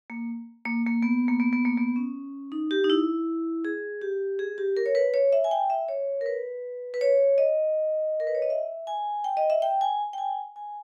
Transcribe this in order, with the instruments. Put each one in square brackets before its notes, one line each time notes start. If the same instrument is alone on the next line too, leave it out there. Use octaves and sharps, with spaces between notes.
[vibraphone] A#3
A#3
A#3
B3
A#3
B3
B3
A#3
B3
C#4
D#4
G4
D#4
E4
G#4
G4
G#4
G4
A#4
C#5
B4
C#5
E5
G#5
G5
E5
C#5
A#4
B4
B4
C#5
D#5
A#4
B4
C#5
D#5
E5
G#5
G5
D#5
E5
G5
G#5
G5
G#5
G#5